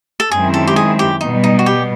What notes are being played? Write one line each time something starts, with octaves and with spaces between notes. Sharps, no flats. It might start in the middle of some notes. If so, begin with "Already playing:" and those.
A4
F#2 D#3 G#3 C4 E4 G#4
A4
G4
G#4
G4
B2 G3 B3 D#4
D#4
F#4
G4